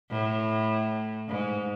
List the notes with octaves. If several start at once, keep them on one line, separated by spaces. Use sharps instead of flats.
A2
G#2